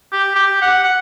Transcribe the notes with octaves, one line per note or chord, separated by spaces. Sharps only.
G4
G4
F#5
F#5